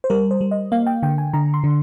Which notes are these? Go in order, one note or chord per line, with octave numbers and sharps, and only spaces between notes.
C5
G3 A#4
C5
G3
D#5
A#3 F5
G5
D3 G5
G#5
D3 A#5
C6
D3